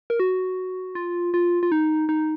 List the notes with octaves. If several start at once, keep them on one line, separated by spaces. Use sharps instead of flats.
A#4
F#4
F4
F4
F4
D#4
D#4